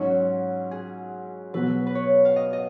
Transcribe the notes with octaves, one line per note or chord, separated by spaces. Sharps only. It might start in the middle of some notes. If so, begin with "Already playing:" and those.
Already playing: G#2 F#3 C#4 C#5 D#5
G#4
B2 F#3 B3 B4
B4
C#5
F5
D#5
D#5